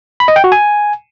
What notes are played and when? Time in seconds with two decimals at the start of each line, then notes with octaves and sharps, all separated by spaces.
0.20 B5
0.28 D#5
0.36 G5
0.44 F#4
0.52 G#5